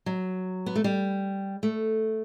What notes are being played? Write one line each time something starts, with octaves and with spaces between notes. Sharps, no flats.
F#3
B3
A3
G3
A3